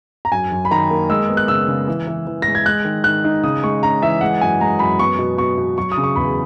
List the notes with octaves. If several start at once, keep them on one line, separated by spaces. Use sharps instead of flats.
A#5
F#2 G#5
F#2
B5
D#3 A#5
A#3
G#3 E6
B3
F#6
C#3 E6
C#3
E3
E3
E3
G#3 A#6
G#6
G#3 F#6
D#3
D#3 F#6
D#4
C#3 D#6
G#3 C#6
C#4 A#5
E3 E5
G#3 F#5
F#2 G#5
G#3 A#5
F#2 B5
B3 C#6
B2
B2 C#6
B2
F#3 C#6
D#6
C#3
C#6
E2 B5